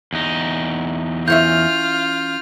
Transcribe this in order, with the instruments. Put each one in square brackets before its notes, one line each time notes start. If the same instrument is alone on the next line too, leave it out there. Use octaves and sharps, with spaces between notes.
[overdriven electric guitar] E2 D#4
[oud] E3 C#4 E5 [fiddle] F4 F6 [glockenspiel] G6